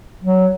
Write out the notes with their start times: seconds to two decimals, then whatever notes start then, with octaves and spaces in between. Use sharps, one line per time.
0.24 F#3